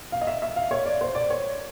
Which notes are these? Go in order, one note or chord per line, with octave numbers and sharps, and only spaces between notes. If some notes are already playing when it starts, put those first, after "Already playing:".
F5
D#5
E5
E5
F5
C#5
D5
C5
D5
C#5